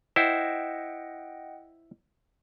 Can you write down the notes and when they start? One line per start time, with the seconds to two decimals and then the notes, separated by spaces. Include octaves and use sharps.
0.16 E4 C5 D#5 F#5 G5